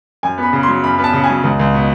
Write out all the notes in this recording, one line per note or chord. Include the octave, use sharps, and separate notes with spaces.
F#2 G#5
B3
B5
C#3
F#3 C6
F#2 B5
B3
A5
C#3
G#5
F#3
C#2
C#2
B2